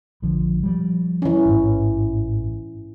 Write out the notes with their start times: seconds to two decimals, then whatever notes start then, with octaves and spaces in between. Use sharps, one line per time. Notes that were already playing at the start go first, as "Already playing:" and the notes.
0.22 A#1 D3 F3
0.63 F3 G3
1.22 E3 C#4
1.46 A1 G#2